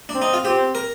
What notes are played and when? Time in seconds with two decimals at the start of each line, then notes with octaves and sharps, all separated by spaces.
0.09 D4
0.14 C4
0.22 D#4
0.34 F4
0.45 C4 G4
0.75 A#4